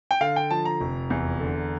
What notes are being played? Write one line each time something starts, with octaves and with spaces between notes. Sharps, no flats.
G5
D3 F5
G5
F3 A5
A#5
F1
E2
D3